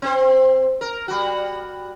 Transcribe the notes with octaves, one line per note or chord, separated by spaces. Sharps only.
C4 C5
A#4
G3 F#4